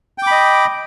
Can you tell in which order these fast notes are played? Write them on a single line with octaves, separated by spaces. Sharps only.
G5 D6 B5 D#5